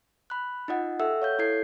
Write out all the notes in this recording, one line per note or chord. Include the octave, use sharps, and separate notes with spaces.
B5 F#6
D#4 F4 D#5 F#5
G4 A4 E5 F#5 E6
C#5 F5 G6
E4 A4 G#6 C7